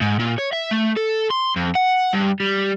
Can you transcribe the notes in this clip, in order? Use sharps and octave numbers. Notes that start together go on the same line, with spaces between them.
G#2
A#2
C#5
E5
A3
A4
C6
F2
F#5
G2
G3